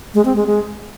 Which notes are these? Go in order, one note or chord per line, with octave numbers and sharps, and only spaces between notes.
G#3
C4
G#3
G#3